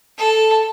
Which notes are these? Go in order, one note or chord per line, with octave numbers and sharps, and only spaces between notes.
A4